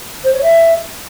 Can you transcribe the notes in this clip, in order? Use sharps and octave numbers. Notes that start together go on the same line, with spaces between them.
C5
C#5
E5